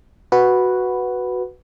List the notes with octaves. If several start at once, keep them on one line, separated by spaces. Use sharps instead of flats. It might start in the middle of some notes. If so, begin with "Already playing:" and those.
F#4 B4